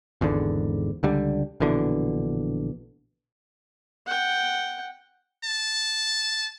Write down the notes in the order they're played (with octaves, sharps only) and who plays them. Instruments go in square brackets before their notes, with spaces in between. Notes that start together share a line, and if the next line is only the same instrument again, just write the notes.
[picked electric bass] G#1 E2 G#2 D3
C#2 D3 G3
A#1 B2 D3 E3
[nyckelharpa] F#5 G5
[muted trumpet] A5